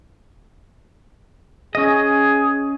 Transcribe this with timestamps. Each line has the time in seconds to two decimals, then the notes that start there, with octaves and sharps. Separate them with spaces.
1.75 C#4 G#4 D#5